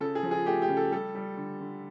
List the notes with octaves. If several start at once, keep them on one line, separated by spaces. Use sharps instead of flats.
C#3 A4
G#4
F3
G#4
A3 G4
G4
C#3
A4
G3 A4
G3
D3
D3